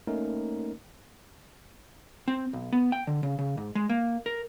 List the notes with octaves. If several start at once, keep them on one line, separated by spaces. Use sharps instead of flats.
A3 A#3 C#4 D#4 A#4
C4
B1
B3
G5
D3
C#3
C#3
G#2
G#3
A#3
A#4